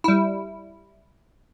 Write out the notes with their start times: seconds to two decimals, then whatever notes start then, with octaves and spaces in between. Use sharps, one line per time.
0.04 G3 E4